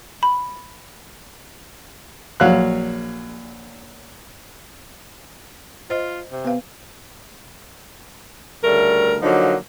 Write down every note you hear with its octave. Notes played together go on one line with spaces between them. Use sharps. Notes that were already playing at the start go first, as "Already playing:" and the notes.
B5
A#1 F#3 F5 F#6
F4 C5 D#5
C3
B3 B4 F5
D2 C#3 G3 A3 A#4
D3 F3 F#3 A#3 D#4